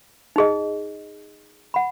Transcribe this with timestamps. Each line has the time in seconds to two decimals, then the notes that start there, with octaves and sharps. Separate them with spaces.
0.36 D#4 G#4 D#5
1.74 F#5 B5